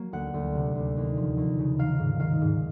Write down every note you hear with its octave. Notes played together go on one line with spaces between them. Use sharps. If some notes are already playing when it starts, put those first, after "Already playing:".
Already playing: F#3 A#3
D2 F#5
D2
C3
D2
D#2
F3
D#2
C#3
D#3 F5
G#2
D#3 F5
G#2